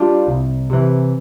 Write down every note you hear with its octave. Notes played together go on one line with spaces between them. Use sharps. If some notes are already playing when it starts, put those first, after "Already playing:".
Already playing: G3 D4 F4
C2
C3 E3